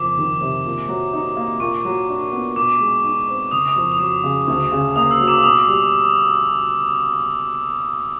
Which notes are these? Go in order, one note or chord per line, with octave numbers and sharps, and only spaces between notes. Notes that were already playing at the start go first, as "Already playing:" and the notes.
Already playing: F#1 F2 D6
D#3
C3
A#2
F#3
D#4
A#3
A#2 C#6
F#3
D4
B3
B2 D6
G#3
D#4
C4
F#1 D#6
D#6
F2
D#6
F#3 D6
C#3
D2
C#3
A#3 D#6
E6
F#3
D6
B2 D#6
G3